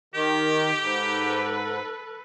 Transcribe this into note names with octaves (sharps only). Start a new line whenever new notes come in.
D#3 G4
G#2 A4 B4